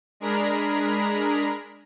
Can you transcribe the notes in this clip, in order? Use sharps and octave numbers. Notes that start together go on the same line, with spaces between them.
G#3 D4 G#4 A#4 A#5 B5